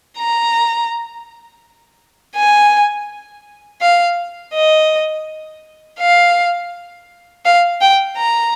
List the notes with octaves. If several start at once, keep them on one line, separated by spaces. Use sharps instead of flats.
A#5
G#5
F5
D#5
F5
F5
G5
A#5